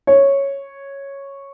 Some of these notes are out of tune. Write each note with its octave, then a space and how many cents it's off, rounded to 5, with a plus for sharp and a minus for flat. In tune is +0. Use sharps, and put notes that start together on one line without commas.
C#5 -5